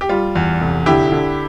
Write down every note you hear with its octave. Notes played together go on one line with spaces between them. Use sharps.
G4
G3 F4
E2
F1
D3 E4 G4
D3